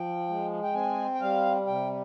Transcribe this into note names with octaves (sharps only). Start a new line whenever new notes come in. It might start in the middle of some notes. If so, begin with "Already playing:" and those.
Already playing: F3 G5
G#3
G5
C4 G#5
G5
G3 F5
C3 G5